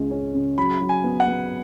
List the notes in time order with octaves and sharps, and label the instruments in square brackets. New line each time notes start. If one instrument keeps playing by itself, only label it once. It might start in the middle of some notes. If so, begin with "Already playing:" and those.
Already playing: [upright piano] C#2 G#3
C#4
C#3
[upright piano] F#3 [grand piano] B5
[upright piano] F#3
[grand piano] G#5
[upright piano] B3
[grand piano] F#5
[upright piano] B3